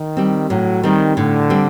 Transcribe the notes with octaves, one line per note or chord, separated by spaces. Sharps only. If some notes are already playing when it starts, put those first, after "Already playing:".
Already playing: D#3
G3 C4
A2 F#3
D#3 G3 C4
A2 D3
G3 C4